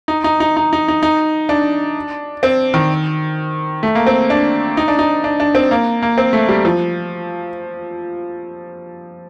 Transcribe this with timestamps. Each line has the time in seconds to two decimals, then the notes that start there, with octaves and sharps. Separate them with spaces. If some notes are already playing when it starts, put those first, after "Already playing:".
0.08 D#4
0.24 D#4
0.40 D#4
0.57 D#4
0.73 D#4
0.88 D#4
1.03 D#4
1.49 D4
2.43 C4
2.74 D#3
3.83 A3
3.95 A#3
4.07 C4
4.30 D4
4.77 D#4
4.88 D4
4.99 D#4
5.24 D4
5.40 D4
5.55 C4
5.71 A#3
6.02 A#3
6.18 C4
6.33 A3
6.49 G3
6.65 F3